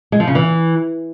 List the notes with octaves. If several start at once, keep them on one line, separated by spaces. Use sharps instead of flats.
G#3
F3
C#3
E3